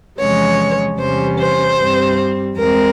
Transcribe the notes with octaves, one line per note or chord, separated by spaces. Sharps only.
E2 C3 F3 G#3 C#4 C#5
E2 C3 G3 C#4 C5
C5
G2 G3 C4
E2 E3 G#3 C4 A#4